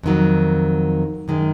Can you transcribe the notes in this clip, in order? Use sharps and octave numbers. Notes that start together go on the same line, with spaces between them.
F2 D#3 F#3
F#2 D#3 G#3